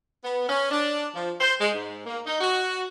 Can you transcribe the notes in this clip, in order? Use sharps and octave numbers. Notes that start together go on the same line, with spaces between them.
B3
C#4
D4
F3
C5
G#3
G#2
A#3
D#4
F#4